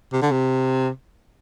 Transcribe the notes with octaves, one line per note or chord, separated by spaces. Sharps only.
C3
D3
C3